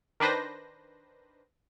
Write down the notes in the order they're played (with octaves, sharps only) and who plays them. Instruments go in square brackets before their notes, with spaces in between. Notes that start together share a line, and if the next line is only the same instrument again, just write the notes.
[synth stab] D#3 D4 B4 C5 A#6